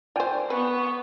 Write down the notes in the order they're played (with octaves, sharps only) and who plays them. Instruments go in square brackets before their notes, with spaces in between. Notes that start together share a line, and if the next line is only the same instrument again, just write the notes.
[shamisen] F4 C5 [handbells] D5 G5 G#5
[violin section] B3 [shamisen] B4 [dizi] C#6